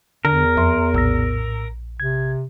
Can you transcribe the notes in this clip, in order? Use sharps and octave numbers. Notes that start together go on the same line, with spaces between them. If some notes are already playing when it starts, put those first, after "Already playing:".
E2 D3 A#4
F2 E5 C6
A#1 A2 E6 A#6
C3 G#6